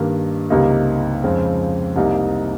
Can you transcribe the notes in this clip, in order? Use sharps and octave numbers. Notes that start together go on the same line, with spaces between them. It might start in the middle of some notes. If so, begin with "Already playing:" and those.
Already playing: G2 D#3 A#3
C#2 C3 G3 A#3 D#4
F2 C#3 G#3 C4
C2 C3 G3 A#3 D#4